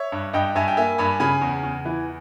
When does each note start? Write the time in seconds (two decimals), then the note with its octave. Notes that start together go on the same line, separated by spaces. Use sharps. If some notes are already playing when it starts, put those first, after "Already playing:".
Already playing: C#5 E5
0.12 G2
0.33 G2 D#5 G5
0.55 G2 E5 G#5
0.68 G5
0.77 A#3 E5 G#5
0.98 G2 G#5 B5
1.20 C#3 G#5 B5
1.41 E2
1.63 E2
1.85 E3